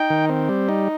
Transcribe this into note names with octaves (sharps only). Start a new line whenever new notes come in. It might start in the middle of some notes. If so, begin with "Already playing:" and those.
Already playing: D#4 G5
D#3
C4
G3
D#4